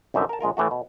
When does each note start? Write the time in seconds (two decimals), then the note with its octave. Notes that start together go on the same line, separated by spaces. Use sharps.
0.14 C2 F#2 D3 D#4 E5
0.29 A#4 A5
0.41 A#1 G#3 F4 A#4
0.57 A2 E3 A3 F#4
0.71 B2